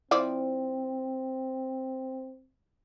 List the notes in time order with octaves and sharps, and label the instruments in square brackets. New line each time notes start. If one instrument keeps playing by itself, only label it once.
[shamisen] F3 E4 D5 [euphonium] C4